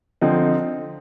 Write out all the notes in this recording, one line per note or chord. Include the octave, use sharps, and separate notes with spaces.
D3 F3 C4 D#4